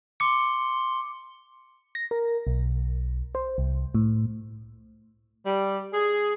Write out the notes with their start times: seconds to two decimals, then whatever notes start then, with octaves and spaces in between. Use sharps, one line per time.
0.20 C6 D6 C#7
1.95 A#6
2.11 A#4
2.47 B1
3.35 C5
3.58 C2
3.95 A2
5.45 G3
5.94 G#4